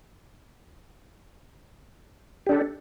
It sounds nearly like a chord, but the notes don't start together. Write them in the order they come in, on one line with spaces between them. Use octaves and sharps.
G4 D4 A4